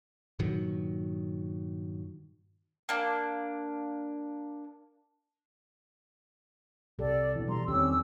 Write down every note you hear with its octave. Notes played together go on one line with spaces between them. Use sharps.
G2 A#2 D#3 F#3
A#3 D4
C2 G4 A4 D5
B2 E3
G3 A#5 C6
E2 D#3 C4 C#4 G4 E6